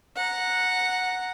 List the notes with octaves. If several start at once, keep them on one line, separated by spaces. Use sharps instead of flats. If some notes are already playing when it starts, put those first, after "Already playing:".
F#5 A#5